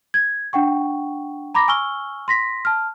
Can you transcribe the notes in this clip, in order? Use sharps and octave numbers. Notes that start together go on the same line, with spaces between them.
G#6
D4 F#5 G5 C#6
A#5 B5 D6 A#6
G#5 C#6 E6 F6 G7
C6 A#6 B6
A5 F6